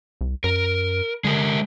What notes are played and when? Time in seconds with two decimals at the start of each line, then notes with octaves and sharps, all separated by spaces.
0.21 C2
0.44 F#2 A#4
1.24 D3 G#3 G4 A#4